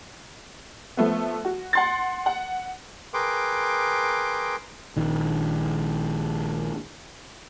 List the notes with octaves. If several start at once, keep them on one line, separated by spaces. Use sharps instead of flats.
F3 A3 B3
F#4
F#5 C6 A6
F#5
G#4 A#4 B4 G5 C6 D6
A#1 D#3